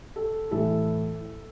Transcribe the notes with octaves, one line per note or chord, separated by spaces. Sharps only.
A4
A2 E3 A4